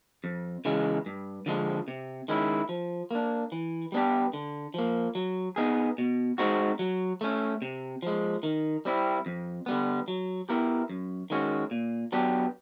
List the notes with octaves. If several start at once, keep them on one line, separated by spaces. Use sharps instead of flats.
F2
C#3 E3 G#3
G2
D3 F3 G#3
C3
D#3 G#3 C#4 E4
F3
A#3 D4
E3
G3 B3 D4 G4
D3
F3 A#3
F#3
B3 D#4 G#4
B2
G#3 C4 D#4 F#4
F#3
A3 C#4
C3
F3 G#3
D#3
G3 C4 E4
F2
D3 G3 B3
F#3
B3 E4 G4 A#4
F#2
D#3 G#3 C#4 F#4
A#2
F#3 B3 D4 G4